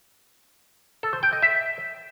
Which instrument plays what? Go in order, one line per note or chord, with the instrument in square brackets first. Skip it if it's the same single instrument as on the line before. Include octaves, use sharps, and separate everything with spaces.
[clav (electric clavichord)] A4
C5
G5
D#5
E5